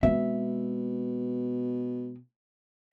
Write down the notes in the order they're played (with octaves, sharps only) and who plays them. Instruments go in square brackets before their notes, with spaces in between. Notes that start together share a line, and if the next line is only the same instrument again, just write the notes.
[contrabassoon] B2 [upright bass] G#3 C4 [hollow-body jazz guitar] E5